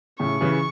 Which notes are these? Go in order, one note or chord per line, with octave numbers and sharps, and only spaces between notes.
A2 C#3 C#6
C#3 E3